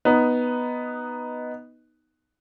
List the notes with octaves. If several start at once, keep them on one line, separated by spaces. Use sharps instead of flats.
B3 D#4